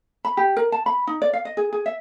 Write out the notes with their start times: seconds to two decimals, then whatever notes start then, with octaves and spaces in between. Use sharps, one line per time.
0.25 B5
0.37 G4
0.57 A#4
0.72 A5
0.86 B5
1.07 D#4
1.22 D5
1.33 F5
1.45 D#5
1.57 G#4
1.73 G#4
1.86 E5